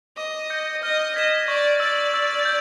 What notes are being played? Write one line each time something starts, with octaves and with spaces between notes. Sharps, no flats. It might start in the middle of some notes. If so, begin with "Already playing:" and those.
D#5 D6
G6 A#6 C#7
D#5 F6
D#5 G#6 B6 E7
D5 C#6
D5 E6 A6
E6
G6